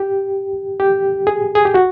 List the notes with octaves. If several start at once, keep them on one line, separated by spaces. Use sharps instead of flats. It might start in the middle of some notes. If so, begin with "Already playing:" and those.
Already playing: G4
G4
G#4
G#4
G4
F#4